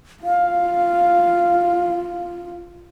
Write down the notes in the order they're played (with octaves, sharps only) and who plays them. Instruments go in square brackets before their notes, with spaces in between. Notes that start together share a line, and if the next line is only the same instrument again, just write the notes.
[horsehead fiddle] F4 [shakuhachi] F5